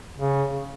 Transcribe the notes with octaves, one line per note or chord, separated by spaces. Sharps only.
C#3